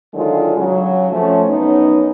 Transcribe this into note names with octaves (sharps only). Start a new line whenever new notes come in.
D3 D#3 F#3 G#3 F4
C#3 F#3
F3 A3 C#4
F#2 B3 C#4 D#4